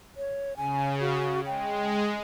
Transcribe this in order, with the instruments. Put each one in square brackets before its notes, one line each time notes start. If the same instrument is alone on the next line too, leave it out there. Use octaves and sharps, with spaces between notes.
[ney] C#5
[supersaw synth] C#3 [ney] G#5
[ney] F#4
[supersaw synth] G#3 [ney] G5